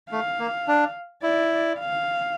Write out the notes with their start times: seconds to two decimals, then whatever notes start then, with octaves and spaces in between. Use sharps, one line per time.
0.11 A3 F5
0.39 A#3
0.68 D4
1.23 E4 D5
1.79 F5